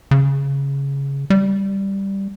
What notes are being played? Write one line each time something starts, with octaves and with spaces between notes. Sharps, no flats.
C#3
G3